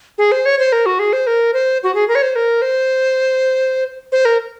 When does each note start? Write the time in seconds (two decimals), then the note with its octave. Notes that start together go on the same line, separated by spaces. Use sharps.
0.18 G#4
0.32 C5
0.46 C#5
0.59 C5
0.72 A#4
0.86 F#4
0.99 G#4
1.13 C5
1.27 A#4
1.54 C5
1.83 F#4
1.95 G#4
2.08 A#4
2.15 C#5
2.22 C5
2.36 A#4
2.62 C5
4.12 C5
4.25 A#4